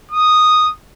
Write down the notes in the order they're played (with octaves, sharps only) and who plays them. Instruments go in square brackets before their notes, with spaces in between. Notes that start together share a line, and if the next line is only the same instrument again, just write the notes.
[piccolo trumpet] D#6